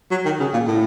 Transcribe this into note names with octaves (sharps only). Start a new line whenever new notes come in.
F#3
D#3
C#3
A#2
A2